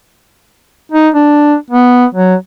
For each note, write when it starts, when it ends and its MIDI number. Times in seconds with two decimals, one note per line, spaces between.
0.92 1.09 63
1.14 1.55 62
1.70 2.05 59
2.15 2.35 54